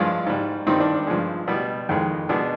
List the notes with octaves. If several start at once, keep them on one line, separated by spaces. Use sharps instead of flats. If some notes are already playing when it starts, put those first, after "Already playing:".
Already playing: G2 F3 G#3 D4 F4
G#2 G3
G2 D#3 G3 C4 D#4
D4
D4
G2 F3 G#3
B2 G3
F2 D#3 G#3
B2 G#3 D4